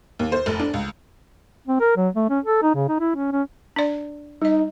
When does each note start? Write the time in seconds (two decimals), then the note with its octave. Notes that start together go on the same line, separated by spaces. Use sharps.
0.19 D#2
0.32 C5
0.46 F1
0.60 D4
0.74 C#2
1.68 C4
1.80 A#4
1.97 F#3
2.15 A3
2.30 C#4
2.45 A4
2.63 D#4
2.75 C#3
2.88 D#4
3.00 E4
3.15 C#4
3.32 C#4
3.76 D4 D5
4.42 G3 D#4 D#5